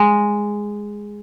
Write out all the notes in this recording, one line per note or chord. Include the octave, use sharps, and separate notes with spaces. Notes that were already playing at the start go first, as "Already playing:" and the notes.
Already playing: G#3